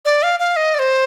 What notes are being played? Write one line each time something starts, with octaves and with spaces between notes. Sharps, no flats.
D5
F5
F5
D#5
D5
C5